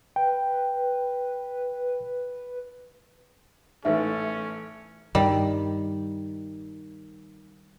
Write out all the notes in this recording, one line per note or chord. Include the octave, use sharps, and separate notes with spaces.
B4 G5
A1 G#2 A3 C#4 B4 E5
G2 D#3 G3